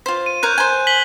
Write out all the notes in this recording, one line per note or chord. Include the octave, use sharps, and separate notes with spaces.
F4 C5
D#7
A#4 C#5 F#6 G6
C5 G#5
B6 F#7 G7